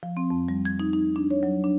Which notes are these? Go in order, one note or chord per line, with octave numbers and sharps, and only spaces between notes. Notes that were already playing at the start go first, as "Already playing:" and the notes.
F3
C4
F2
G3
G#6
D#4
D#4
D4
C#5
F#3
D4